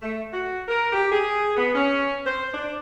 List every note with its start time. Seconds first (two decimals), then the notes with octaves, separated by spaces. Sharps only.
0.02 A3
0.33 F#4
0.68 A#4
0.93 G4
1.12 G#4
1.57 B3
1.75 C#4
2.26 C5
2.53 D4